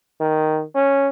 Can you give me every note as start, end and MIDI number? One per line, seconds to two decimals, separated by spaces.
0.20 0.63 51
0.75 1.09 61